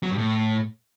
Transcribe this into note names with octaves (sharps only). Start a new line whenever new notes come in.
F#3
G2
A2